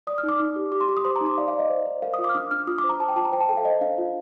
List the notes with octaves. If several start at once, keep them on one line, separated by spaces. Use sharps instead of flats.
D5 D#6
F6
D#4
D6
D#4
G4
G4 D6
C6
G4 D6
D#6
C5 C6
A#5
D#4
D6
D5 F5
F5
D5
D#5
C5
C5
A#4 F5
D#6
F4
D6
F6
D4 D#6
D4 F6
F4 D#6
D6
C5
A#5
C5 A5
G5
F4 A5
A#5
C5 G5
A5
A4 G5
F5
C5 D#5
D4 F5
F4